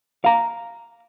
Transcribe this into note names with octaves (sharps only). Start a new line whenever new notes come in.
F5 A#5